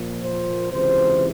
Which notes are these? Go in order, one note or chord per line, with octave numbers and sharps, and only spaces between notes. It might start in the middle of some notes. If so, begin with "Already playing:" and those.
Already playing: A#2 F3 A#3
C5
C#2 C3 E3 C5